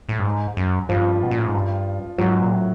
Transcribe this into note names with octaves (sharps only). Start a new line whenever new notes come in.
A2
G2
G#2
F#2
G2 F3 F4
B2
A#2
A2
G#2
G2
G#2 F#3 F#4
A#2
A2